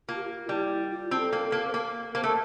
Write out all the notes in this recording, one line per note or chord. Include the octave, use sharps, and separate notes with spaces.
A#3 F4
G4
F4
G3 E4
F4
C4
A4
A#3
A#4
A4
A#3
C5
A#3 A#4
A#3 C5
A3
A#4